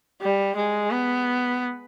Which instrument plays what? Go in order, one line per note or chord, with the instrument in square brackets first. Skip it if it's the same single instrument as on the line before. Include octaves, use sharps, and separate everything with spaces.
[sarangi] G3
G#3
B3